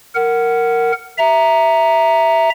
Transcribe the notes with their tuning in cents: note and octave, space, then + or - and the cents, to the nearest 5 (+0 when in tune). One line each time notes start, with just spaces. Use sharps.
A#4 -10 F#5 +10
E5 +0 A#5 +0